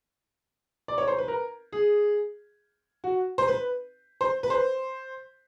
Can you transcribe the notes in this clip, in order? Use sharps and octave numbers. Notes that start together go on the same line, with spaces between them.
D5
C#5
C5
B4
A#4
G#4
F#4
C5
B4
C5
B4
C5